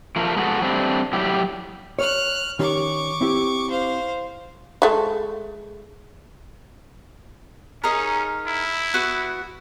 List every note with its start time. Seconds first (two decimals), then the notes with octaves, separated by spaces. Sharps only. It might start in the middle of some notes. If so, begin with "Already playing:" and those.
0.16 F3 A3 A#4
0.36 G#3 A3 B3 F#4 A4
0.62 G3 A3 C4 D4
1.13 A2 F#3 G3 E4 G4
1.99 C#5 F6 F#6
2.59 D#3 C#4 G4 C#6 D6
3.21 C4 E4 G4
3.70 C5 F5
4.82 G#3 A3
7.84 C#4 D#4 G#4 A#4
8.47 E4
8.94 B3 F#4